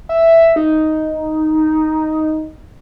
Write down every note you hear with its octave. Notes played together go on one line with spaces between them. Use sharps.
E5
D#4